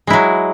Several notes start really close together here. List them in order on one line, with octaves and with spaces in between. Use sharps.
G#3 E4 F#3